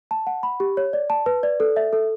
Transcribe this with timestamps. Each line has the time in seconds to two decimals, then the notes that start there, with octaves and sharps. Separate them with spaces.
0.11 A5
0.27 F#5
0.43 B5
0.60 G4
0.77 C#5
0.93 D5
1.10 A5
1.26 B4
1.43 D5
1.60 A4
1.76 E5
1.93 A4